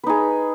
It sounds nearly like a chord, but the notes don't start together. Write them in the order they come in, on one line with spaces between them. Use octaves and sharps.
B4 D#4 G#4